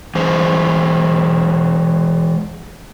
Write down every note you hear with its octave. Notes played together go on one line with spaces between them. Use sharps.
E3 G#3 C5